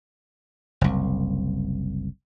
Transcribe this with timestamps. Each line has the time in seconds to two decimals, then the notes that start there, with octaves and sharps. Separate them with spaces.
0.81 F#1 C2